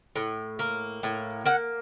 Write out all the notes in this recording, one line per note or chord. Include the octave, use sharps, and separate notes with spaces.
A2
A#3
A2
A#3 F#5